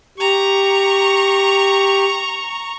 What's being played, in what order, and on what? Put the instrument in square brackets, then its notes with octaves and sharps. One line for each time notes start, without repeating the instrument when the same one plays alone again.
[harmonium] G4 [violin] A#5 C#6